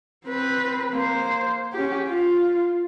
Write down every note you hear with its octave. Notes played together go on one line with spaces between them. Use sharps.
C4 B4
A#3 C5
C#4 G4
F4